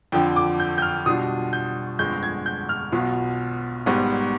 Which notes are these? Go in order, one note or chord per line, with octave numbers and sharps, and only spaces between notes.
F2 D3 F3 G5
D6
G6
G6
F6
B2 G3 D4 F4 D#6
G6
G1 F2 D3 G#3 G6
G#6
G6
F6
B1 B2 B3 F4
G#1 G#2 G3 B3